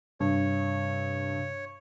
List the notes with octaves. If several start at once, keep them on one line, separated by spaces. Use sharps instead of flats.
G2 C3 C#5